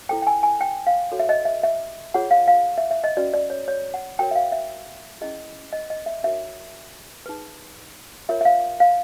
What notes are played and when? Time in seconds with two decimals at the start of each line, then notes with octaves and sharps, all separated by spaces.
0.09 E4 A4 C5 G5
0.22 G5
0.27 G#5
0.43 G#5
0.61 G5
0.87 F5
1.12 F#4 A4 C#5
1.20 E5
1.29 D#5
1.45 E5
1.63 E5
2.14 F4 G#4 C#5 F#5
2.31 F5
2.48 F5
2.78 E5
2.91 E5
3.04 D#5
3.17 C#4 F#4 B4 D5
3.34 D5
3.50 C#5
3.68 C#5
3.94 F#5
4.19 F#4 A#4 C#5 G5
4.31 E5
4.35 F5
4.52 E5
5.21 C#4 E4 G#4 D#5
5.72 D#5
5.90 D#5
6.06 E5
6.23 D4 F#4 A#4 C#5 E5
7.26 D#4 G#4 B4
8.29 F4 A#4 C#5 E5
8.41 E5
8.45 F5
8.80 F5